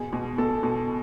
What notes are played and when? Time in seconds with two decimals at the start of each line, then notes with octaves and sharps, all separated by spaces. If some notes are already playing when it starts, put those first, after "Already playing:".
Already playing: B2 G#4
0.13 B2
0.38 B2 A4
0.63 B2